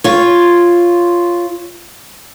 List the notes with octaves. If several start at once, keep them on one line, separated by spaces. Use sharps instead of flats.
F4 C#5